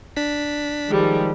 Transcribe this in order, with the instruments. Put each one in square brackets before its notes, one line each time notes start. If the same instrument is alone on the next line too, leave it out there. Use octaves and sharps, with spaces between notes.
[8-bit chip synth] D4 B6
[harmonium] D#3 F3 [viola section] G3 G#3